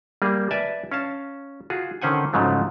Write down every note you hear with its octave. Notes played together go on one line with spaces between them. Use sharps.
G3 A#3 G#4
B4 D5 E5 G#5 A5
C#4 F5 A5
F4 F#4 G#4
D3 D#3 C#4 C5 F#5 G#5
G#2 C#3 F3 F#3 A3